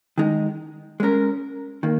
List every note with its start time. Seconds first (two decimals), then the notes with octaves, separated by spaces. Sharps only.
0.18 D#3 G#3 D#4
1.00 G#3 C#4 A#4
1.83 D#3 A#3